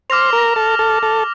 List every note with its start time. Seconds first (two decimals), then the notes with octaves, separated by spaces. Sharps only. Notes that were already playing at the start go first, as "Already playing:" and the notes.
0.10 C5 D6 F6 A#6 F7
0.33 A#4
0.56 A4
0.79 A4
1.03 A4